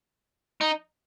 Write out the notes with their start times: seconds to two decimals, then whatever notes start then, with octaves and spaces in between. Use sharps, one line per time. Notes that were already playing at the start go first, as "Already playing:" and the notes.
0.61 D#4